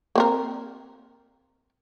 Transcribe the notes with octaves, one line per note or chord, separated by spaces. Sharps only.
A#3 C4 A#4